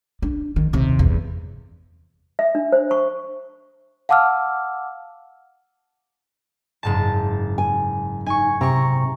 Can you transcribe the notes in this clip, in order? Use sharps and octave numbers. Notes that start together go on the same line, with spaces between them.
D4
D#3
D#2 C3
G1 E2
E5
D4
C5
C#6
F5 F#5 A5 D6 E6 F6
F#1 G#2 A5
G#5
D#4 G#5 C#6
C3 A#5 C#6